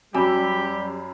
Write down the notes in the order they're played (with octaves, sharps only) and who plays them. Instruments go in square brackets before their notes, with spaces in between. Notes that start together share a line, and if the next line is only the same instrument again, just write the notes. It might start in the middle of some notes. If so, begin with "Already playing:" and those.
[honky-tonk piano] F#2 B5 E6 [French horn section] G3 [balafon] F#4 G#5 [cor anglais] G4